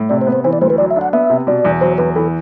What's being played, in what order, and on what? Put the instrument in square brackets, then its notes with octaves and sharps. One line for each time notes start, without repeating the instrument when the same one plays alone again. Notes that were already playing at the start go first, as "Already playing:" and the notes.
Already playing: [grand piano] A2
[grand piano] C3 [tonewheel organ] D5
[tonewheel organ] C5
[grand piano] B3
[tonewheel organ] C5
[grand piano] E3 [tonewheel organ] C5
[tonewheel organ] D5
[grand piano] D2 [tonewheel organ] C5
[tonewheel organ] B4
[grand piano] F#3 [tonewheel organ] D5
[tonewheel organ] E5
[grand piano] D4
[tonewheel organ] F#5
[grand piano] B3 [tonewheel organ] E5
[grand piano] C3
[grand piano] B2 [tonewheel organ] D5
[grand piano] E2
[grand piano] F#3 [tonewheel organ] C5
[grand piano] E2 [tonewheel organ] B4
[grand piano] E3 [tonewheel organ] A4